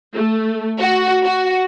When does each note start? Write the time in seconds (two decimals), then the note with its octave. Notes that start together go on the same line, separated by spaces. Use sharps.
0.15 A3
0.79 F#4
1.24 F#4